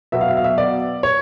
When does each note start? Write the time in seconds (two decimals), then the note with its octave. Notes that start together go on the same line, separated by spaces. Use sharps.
0.12 B2 F#3 B3 E5
0.21 F5
0.28 E5
0.37 F5
0.44 E5
0.58 D5
1.03 C#5